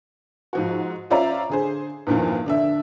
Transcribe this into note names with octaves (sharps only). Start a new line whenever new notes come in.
G#2 F3 F#4
C#4 F4 C5 D5 E5 A#5
D3 G#4 C5
E2 G2 A#2 D#3 F3
D3 D4 E5